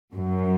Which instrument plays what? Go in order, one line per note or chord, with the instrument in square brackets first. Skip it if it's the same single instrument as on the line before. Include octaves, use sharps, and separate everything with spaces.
[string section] F#2